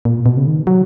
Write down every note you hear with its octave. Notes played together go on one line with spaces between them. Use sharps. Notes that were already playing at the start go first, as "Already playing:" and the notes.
A#2
B2
C#3
D#3
F#3